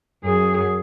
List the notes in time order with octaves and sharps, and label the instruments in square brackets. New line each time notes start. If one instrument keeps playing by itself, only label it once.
[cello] F#2 G#4